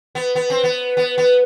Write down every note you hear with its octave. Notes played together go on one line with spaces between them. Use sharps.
B3
B3
C4
B3
B3
B3